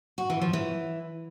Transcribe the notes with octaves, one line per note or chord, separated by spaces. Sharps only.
F#4
E3
F3
E3